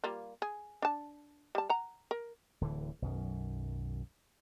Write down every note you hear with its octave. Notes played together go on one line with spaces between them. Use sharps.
G3 A#3 F4
G#4
D4 A5
G3 A5
F#5 A#5
A#4
D1 D3 E3
B1 F#2 D#3